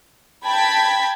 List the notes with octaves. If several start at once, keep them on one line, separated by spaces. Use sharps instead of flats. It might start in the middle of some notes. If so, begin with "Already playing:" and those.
G5 A5 B5 G#6 B6